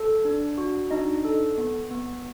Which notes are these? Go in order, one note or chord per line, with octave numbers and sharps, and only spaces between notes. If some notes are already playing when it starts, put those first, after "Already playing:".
Already playing: A4
D4
F#4
D4 D#4 D#5
A4
B3
B3